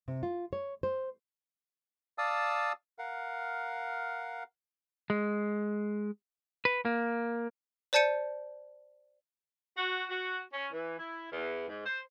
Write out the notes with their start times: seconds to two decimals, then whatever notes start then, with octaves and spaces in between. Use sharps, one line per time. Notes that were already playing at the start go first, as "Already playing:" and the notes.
0.08 C3
0.23 F4
0.53 C#5
0.83 C5
2.18 D5 F5 A5 D#6 E6
2.99 A#4 F5 F#5
5.10 G#3
6.65 B4
6.85 A#3
7.93 C5 D5 A5 G6 C#7 D#7
9.76 F#4
10.10 F#4
10.54 C#4
10.73 E3
10.99 E4
11.32 E2
11.69 G#2
11.85 C5